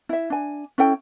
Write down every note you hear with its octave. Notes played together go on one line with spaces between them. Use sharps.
E4 E5
D4 G#5
C#4 E4 A4 G5